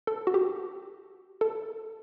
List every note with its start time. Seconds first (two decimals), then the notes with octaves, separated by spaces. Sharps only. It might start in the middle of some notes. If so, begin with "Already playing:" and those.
0.07 A4
0.27 F#4
0.34 G4
1.41 A4